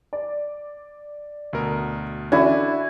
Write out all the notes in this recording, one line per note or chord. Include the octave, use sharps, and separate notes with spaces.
D5
D2 B2 A#4
D3 C#4 D4 E4 F#4 G#5